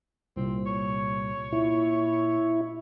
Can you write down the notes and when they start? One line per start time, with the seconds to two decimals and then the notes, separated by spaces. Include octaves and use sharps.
0.37 C2 A#2 C4
0.66 C#5
1.52 A#2 E4